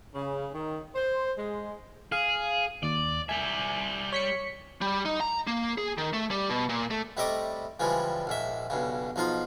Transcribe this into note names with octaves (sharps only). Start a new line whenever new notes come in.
C#3
D#3
C5
G#3
G#4 F5
D#2 D5
G3 E5 G#5
C#5 B6 C#7
G3
D#4
A#5
A#3
G#4
D#3
A3
G3
B2
A#2
A3
C3 G3 A3 D#5 D6
C#3 E3 F3 G3 G#3
A#1 G#2 E5
B1 G2 C#3
B1 F3 D#4 F4 C6